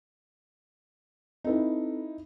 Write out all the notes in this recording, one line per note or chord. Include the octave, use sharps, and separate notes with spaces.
C4 D#4 E4 A4 B4